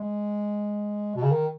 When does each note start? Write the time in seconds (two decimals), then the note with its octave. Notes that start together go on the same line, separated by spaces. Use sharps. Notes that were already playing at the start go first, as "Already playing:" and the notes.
Already playing: G#3
1.16 B2
1.23 C#3
1.31 D#3